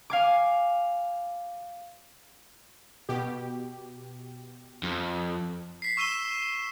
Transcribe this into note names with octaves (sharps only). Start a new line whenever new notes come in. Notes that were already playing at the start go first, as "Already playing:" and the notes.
F5 G#5 D6
B2 G4
F2
B6 C7
C#6 E6 D#7 E7 G7